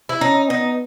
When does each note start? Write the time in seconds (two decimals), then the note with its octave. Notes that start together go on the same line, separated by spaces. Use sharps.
0.09 E4
0.21 C#4 D#4
0.49 B3 D#4